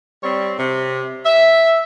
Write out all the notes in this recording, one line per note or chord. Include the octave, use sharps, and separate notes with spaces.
G3 C4 C#5
C3
E5